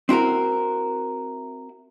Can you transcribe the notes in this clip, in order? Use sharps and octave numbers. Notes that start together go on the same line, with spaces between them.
C4 E4 F#4 A#4